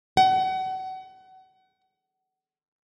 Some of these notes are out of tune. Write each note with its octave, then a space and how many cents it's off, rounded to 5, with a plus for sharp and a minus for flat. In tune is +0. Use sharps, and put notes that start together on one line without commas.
F#5 +30